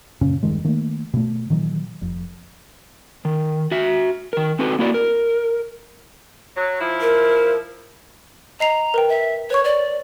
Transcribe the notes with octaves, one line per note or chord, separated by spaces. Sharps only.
F#2 A#2 C#3 C#4
E1 G2 D#3 G#3
D#3 A3 A#3
B2 A3
A#2 D#3 E3 F#3
F1 F2
D#3
F#4 E5
D#3 A#4
C4 F#4 A4 B4
A#3 E4 F#4 D5
A#4
F#3
F3 E4
A#4
D#5 A#5 C7 F7
A#4 B4 G5
E5
B4 C#5 C#6
C#5 D5